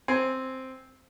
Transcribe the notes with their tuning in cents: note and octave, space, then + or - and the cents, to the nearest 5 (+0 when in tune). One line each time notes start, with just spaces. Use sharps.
C4 +0 G#5 +0